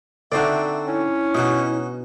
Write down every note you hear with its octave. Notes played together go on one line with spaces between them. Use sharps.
D3 C4 D4 D#4 F#4 D5 E5
C#4 E4
B2 D#4 F#4 D#5